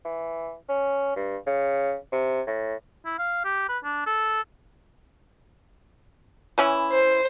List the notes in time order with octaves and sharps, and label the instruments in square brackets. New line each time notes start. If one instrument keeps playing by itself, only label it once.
[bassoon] E3
C#4
G2
C#3
C3
A2
[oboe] E4
F5
G4
B4
D4
A4
[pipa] E3 C#4 E4
[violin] C5